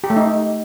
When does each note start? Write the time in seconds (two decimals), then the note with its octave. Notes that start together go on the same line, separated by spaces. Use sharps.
0.04 G4
0.10 A3
0.16 D#4